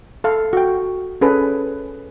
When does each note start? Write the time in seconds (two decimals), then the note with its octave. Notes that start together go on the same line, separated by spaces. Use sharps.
0.24 A4 F5
0.53 F#4 G5
1.21 C#4 G#4 A4 B4